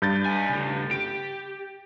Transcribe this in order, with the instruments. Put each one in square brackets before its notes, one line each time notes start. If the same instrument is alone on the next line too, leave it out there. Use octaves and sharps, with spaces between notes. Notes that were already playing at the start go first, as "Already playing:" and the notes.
[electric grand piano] G2 G6 A6
[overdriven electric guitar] D#4 G#5
C#3 A3
[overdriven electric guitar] G4 [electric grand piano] D7